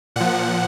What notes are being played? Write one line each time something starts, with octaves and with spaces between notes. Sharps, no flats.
A#2 F3 F#5